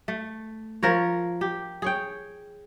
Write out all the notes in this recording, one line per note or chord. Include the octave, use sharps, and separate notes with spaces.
A3
F3 A#4 C#5
G4
G#4 C#5 G5